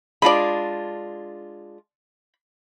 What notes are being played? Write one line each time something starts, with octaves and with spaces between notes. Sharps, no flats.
G#3 D4 F4 D5 B5